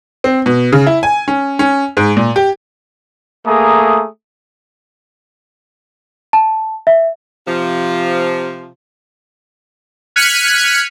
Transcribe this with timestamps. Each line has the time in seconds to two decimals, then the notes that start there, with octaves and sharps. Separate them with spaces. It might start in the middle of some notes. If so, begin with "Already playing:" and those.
0.24 C4
0.46 B2
0.73 C#3
0.87 E4
1.03 G#5
1.28 C#4
1.59 C#4
1.97 G#2
2.17 A#2
2.36 G4
3.46 A3 A#3 G#4 A#5 D#6
6.33 A5
6.87 E5
7.47 C3 F3
10.16 F6 F#6 G#6 B6 C#7 D#7